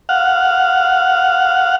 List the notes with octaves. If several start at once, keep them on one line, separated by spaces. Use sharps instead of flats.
F5 F#5